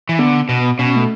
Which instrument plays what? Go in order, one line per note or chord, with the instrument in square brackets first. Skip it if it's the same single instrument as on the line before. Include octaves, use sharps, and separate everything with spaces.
[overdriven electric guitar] E3
[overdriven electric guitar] D3 [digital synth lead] B3
[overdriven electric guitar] B2 [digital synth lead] B3
[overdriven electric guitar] B2 [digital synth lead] C#4
[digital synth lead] A3